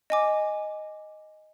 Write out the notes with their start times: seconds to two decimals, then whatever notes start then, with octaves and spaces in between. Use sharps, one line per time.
0.10 D#5 G#5 D6